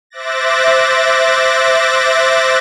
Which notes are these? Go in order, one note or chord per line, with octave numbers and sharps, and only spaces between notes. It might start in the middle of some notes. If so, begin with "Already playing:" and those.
C5 E5 D6 F#6 A6 A#6